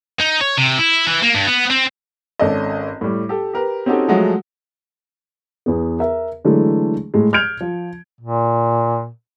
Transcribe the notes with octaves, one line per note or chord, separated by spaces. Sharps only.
D#4
C#5
C3
E4
E3
A#3
G2
B3
C4
G#1 C#4 A4 D5 D#5
A2 G3
G4 A4
G4 A#4 B4
C4 C#4 D#4 F#4 G4 A4
F3 F#3 G#3 A3 F#4
E2 B3
A#4 E5
D3 E3 F#3 G#3 A3
A2 G#3
F6 G6 G#6 D7 F7
F3
A#2